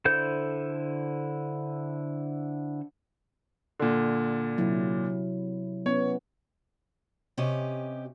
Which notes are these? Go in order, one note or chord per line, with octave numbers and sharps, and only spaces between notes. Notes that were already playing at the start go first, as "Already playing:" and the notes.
D3 E4 A4 C5 G6
A#2 D3
C3 F#3 E4
B3 C#4 C#5
C3 C#4 G4 D#5